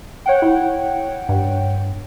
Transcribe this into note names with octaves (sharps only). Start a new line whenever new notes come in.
C#5 F#5 G5
E4
G2